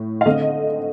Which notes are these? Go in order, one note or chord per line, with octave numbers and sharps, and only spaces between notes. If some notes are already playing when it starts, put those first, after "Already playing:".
Already playing: A2
F5
D3 A3 C4 D#5